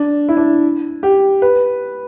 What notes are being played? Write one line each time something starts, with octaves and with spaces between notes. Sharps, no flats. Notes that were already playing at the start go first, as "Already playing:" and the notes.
Already playing: D4
E4
D4
G4
B4